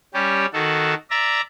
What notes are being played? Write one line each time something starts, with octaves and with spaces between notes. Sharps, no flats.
G3 C#4 G4
D#3 F#4 A4
D5 E5 A#5